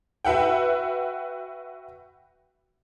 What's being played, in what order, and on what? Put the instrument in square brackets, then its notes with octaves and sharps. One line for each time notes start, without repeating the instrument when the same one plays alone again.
[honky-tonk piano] F#4 B4 E5 F#5 G5